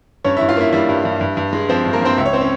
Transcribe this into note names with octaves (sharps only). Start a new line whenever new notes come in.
G2 C#4 C#5
E4 E5
G2
F4 F5
A#3 E4 E5
G3 E4 E5
G2
G2
G2
G2
G#3
F3 C4 C5
G2
A#3 A#4
G2 C4 C5
C#2 E5
C#5
C4 C5
C#4